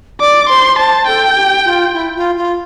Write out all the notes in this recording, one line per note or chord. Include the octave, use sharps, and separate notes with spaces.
D5 D6
C5 C6
C5 A5
A4 G5
G4
F4
E4
F4
F4